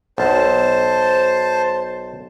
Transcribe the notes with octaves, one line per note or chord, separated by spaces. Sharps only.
B1 C5 A5